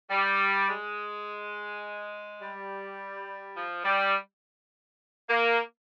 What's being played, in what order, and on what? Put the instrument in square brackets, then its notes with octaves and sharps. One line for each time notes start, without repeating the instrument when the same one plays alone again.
[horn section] G3
G#3
G3
F3
G3
A#3